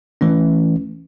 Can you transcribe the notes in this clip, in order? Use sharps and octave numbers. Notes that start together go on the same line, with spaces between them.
E3 A3 C#4